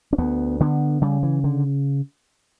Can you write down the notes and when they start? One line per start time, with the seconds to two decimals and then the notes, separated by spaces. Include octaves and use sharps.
0.13 C#4
0.18 D2 B3
0.60 D3 B3
1.02 C#3 G3
1.23 E3
1.44 D3